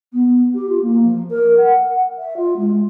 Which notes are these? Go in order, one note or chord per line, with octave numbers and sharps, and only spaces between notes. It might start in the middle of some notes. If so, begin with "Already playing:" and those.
B3
G4
F4
A#3
F3
A#4
F#5
E5
F4
G#3